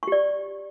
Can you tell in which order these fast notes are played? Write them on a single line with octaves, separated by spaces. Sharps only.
C#6 G4 D5